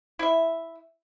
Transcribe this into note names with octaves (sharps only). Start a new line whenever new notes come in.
E4 E5